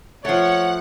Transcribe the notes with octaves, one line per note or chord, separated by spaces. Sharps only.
F3 A3 C#5 F#5